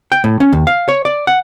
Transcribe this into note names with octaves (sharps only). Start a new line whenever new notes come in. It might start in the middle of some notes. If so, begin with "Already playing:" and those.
G5
A2
C#4
D#2
F5
C#5
D5
F#5